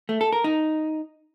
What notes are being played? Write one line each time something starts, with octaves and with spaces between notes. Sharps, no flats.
A3
A4
A#4
D#4